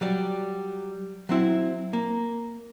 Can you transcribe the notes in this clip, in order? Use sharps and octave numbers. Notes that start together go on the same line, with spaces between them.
F#3 G3 D5
F#3 C4 E4
A#3